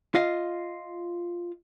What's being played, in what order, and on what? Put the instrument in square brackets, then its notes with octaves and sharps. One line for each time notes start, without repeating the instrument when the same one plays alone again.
[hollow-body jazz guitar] F4 D#5 F5